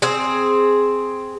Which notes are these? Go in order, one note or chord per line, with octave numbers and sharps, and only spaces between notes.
C4 G#4